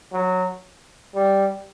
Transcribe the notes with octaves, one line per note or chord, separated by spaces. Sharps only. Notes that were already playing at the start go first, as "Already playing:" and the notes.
F#3
G3